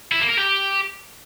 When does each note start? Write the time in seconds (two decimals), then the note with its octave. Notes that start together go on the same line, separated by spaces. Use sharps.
0.12 E4
0.21 A#3
0.29 A#4
0.38 G4